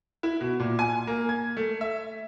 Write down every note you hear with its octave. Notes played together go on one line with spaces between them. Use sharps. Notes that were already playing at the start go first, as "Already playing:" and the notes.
E4
B2
A#2
G#5
A#3
G#6
A3
E5